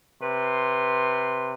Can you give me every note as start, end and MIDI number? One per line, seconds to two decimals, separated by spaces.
0.21 1.53 48
0.21 1.53 71
0.21 1.53 84